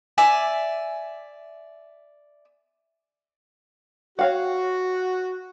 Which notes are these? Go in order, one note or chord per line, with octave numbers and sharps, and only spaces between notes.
D5 E5 G#5
F#4 C#5 F5 F#5